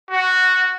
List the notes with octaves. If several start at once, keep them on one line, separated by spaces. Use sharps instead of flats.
F#4